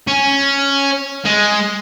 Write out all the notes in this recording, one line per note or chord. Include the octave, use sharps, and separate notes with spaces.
C#4
G#3